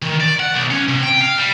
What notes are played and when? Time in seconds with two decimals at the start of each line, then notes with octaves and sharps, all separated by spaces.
0.02 D#3
0.20 D5
0.40 F#5
0.54 B1
0.71 C#4
0.88 C3
1.03 G5
1.21 F5
1.38 G3